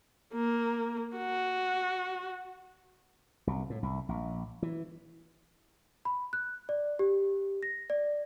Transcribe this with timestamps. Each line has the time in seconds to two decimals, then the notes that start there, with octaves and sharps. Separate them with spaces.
0.34 A#3
1.16 F#4
3.47 C2
3.70 A2
3.83 C2
4.09 A#1
4.62 E3
6.05 B5
6.33 F#6
6.69 D5
6.99 G4
7.63 A#6
7.90 D5